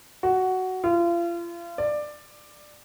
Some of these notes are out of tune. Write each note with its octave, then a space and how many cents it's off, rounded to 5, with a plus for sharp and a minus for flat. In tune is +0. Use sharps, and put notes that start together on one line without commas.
F#4 +10
F4 -35
D5 +15